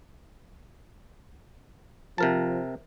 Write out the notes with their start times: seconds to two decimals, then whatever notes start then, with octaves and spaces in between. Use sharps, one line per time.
2.18 C3 F3 A#4 A5